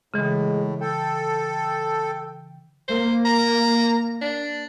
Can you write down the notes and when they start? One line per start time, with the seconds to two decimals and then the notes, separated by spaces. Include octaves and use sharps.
0.14 A2 C#3 E3 G#3
0.81 A4 G5
2.88 A#3 C5
3.25 A#5
4.22 D4